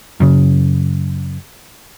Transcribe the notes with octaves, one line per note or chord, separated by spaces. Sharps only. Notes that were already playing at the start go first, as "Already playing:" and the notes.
F#2 C#3